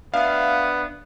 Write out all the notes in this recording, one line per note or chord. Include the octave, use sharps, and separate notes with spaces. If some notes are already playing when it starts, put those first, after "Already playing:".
B3 D4 E5 F5